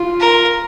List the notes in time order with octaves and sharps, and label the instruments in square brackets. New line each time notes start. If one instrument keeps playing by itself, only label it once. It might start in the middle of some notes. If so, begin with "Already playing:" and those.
Already playing: [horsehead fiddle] F4
[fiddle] A#4